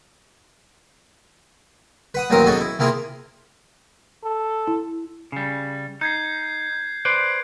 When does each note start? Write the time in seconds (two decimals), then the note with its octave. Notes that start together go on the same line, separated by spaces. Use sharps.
2.14 B4 F#5 D#6
2.30 A1 D#2 F#3 C4 A#4 D#6
2.46 F#2 B2 F#4 G#4 A4
2.60 E4
2.79 C3 A#3 E4 F4 G#4
4.24 A4
4.67 E4
5.32 C#3 G3
6.01 D#4 G6 G#6 C7
7.05 B4 C5 D5 D7